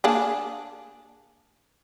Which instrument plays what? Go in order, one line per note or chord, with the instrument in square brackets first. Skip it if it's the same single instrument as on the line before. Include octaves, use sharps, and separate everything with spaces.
[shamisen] A#3 D4 G#4